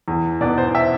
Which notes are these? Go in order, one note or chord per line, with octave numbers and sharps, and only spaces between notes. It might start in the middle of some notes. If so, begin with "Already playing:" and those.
E2
B2 B3 D5
C5
E5